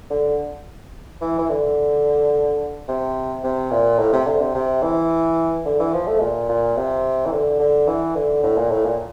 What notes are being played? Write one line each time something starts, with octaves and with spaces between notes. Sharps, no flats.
D3
E3
E3
D3
C3
C3
A#2
A2
C3
D3
C3
C3
E3
D3
E3
F3
A3
A#2
A#2
C3
E3
D3
D3
E3
D3
A2
A#2
A2
A#2